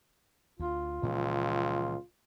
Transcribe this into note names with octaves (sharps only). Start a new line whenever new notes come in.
D2 F4
C#2 A#2 E3 F3